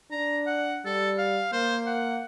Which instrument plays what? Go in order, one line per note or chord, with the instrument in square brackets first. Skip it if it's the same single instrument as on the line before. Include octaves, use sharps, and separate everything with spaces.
[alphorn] D4 [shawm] A#5
[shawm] F#5
[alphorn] G3 [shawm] A4
[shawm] F5
[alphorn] A#3 [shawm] C5
[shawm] F#5